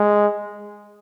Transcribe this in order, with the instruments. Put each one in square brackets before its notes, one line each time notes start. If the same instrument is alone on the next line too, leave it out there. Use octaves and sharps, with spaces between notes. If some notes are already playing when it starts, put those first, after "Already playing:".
Already playing: [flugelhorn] G#3